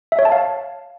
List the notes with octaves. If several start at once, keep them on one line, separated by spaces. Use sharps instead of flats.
E5
C#5
A5
F5